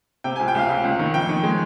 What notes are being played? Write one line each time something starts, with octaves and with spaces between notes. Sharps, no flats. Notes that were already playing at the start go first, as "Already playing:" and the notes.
C3 G5
G#5
C#2
G5
C#2 F5
C#2
C#2
D#3
F2 G5
D#3
G#3